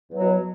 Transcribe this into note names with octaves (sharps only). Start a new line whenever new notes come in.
E2 B2 F#3